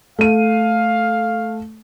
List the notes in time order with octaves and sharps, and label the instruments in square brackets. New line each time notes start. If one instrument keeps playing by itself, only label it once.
[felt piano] A3 D#7 [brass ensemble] F5